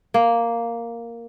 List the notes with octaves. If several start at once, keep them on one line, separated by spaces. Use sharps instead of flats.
A#3